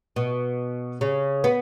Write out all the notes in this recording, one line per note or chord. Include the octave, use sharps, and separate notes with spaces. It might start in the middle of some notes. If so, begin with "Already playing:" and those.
B2
C#3
B3